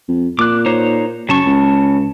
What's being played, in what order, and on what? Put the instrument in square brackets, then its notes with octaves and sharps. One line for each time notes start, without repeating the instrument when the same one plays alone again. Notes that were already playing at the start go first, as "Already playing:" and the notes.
[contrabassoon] F2
[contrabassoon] A#2 [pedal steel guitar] D6 F#6
[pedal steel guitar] D#4 C5 C#5
[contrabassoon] F#2 [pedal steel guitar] C#3 A5 C#6
[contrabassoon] C#2